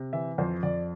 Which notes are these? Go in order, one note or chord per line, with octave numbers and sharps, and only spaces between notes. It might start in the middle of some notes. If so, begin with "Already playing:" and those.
Already playing: C3
E3 E5
F2 C5
F2 D5